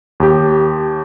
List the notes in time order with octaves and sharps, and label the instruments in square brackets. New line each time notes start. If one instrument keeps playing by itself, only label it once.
[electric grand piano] D#2 G4